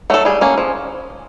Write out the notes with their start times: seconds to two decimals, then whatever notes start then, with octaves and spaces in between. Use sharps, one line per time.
0.10 F#3 A3 A4
0.25 G3 G#4
0.41 A#3 C#4
0.58 F3